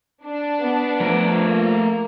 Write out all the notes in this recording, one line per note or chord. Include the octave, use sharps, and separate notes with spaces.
D4
B3
F3 A3 A#4
A#3